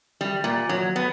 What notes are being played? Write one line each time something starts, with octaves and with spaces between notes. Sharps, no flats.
G3
A#2
F#3
B3